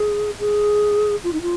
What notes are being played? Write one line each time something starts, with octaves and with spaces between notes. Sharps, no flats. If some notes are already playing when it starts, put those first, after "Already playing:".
Already playing: G#4
G#4
F4
D#4
F4